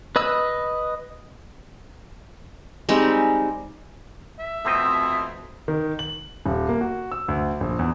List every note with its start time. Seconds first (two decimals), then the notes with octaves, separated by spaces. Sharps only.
0.16 B4 D#5 B5 E6
2.89 G3 G#3 C4 D#4
4.39 E5
4.65 F2 B2 A3 C4 D#5 D#6
5.68 D#3
5.99 F#7
6.46 D#1
6.69 A#3
6.81 F#4
7.12 E6
7.28 D2
7.61 A#1
7.79 E2